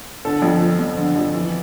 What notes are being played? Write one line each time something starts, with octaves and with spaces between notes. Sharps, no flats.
D3 A4
F2
F3
F2
D3
F2
E3